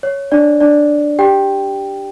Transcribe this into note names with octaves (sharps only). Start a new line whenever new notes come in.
C#5
D4 D5
D4 D5
G4 G5